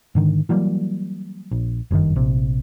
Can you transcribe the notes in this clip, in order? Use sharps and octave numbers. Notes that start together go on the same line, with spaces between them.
G#2 D3 D#3
E3 F#3 G3 A#3
A#1
F#1 G2 B2 D#3
A#1 C3